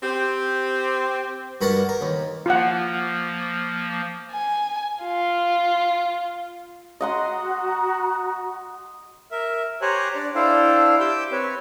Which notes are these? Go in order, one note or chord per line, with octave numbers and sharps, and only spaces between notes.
C4 G4
G2 F#4 A#4 F#5 A5
A#4
D#2
F3 A#3 F4 F#5
G#5
F4
F#4 D#5 F#5 A#5 C6
A#4 E5
G4 C5 C#5 G#5 A#5 F#6
D4 D5
D4 E4 A4 C5 F5 G5
G4 D6 E6 G6
C4 B4 C#5